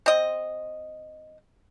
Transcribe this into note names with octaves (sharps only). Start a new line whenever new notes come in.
C4 D#5